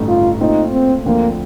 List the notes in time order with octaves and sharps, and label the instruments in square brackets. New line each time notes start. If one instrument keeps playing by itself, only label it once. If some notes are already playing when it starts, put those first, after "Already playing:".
Already playing: [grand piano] A1 G2 D3 A3 D#4
[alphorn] F4
[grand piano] A#2 A3 C4 F4 [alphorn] D#4
[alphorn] C4
[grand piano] D2 D3 F3 C4 [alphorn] A#3